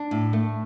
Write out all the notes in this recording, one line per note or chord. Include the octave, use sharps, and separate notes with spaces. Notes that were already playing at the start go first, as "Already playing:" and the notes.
Already playing: D4
A2
A3